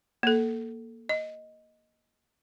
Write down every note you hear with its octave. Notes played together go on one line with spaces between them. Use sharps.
A#3 A4
D#5